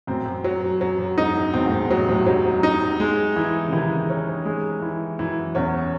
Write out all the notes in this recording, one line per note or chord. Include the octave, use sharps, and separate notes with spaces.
F#2 A2 C4
F#2
F#3
F#2
F#2 F#3
F#2
E2 G#2 D#4
F#2
E2 G#2 C4
A2
E2 G#2
G#2
F#2 A2 F#3
C3
F#2 A2
G#2 C3 F#3
D#4
G#3
E3
C#3
C3 D#3 E3
C#4
G#3
E3
F#2 E3
E2 C#4